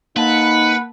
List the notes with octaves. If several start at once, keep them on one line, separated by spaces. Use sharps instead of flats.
A#3 D#4 B4 F#5 A5